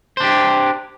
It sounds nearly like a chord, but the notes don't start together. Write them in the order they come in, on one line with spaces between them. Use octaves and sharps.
C5 D4 G4